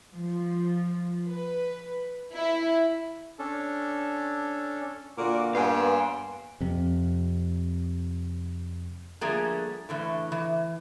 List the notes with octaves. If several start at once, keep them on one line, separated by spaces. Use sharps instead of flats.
F3
B4
E4
C#4 D4 A4
A#2 D3 A#3 F#4 D6
G2 A#3 B3 F5 G#5 C6
F2 C3
D3 F3 G3 A3 A#3 G#4
A2 D3 E3
E3